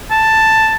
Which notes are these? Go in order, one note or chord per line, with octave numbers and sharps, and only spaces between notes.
A5